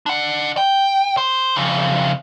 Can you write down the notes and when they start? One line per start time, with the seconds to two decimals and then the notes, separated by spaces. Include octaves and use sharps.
0.06 D4 F#5
0.57 G5
1.17 C5
1.56 F2 C#3